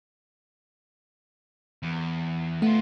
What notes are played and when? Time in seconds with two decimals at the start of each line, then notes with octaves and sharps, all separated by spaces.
1.83 E2
2.62 A3 B3 F4